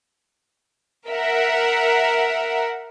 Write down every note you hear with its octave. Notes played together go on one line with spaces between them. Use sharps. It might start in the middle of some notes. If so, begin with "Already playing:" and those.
A#4 E5 F#5